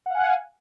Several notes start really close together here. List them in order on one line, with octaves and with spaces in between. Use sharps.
F#5 F5 G#5